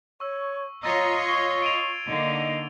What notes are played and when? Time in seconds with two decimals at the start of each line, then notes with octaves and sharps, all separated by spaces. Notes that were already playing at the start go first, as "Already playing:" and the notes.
0.20 C#5 C#6 E6
0.83 F4 C#5 D#5 A#5 E6 A6
1.26 C#6 G#6 C7 G7
1.62 D7 D#7 F7
2.07 D3 A#3 D#4 D#5